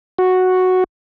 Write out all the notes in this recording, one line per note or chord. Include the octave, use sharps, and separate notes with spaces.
F#4